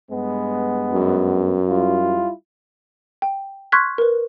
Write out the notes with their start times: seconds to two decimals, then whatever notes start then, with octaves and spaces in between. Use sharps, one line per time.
0.11 G2 G#3 B3
0.93 F#2
1.68 G3 E4 F4
3.22 G5
3.72 C6 C#6 F6 F#6 G#6 B6
3.98 A#4 B4